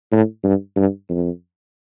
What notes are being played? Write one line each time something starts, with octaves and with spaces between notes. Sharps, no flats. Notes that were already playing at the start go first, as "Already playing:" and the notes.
A2
G2
G2
F2